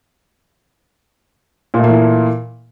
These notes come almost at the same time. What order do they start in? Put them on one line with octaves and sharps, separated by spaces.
A#2 A3 A#3 E3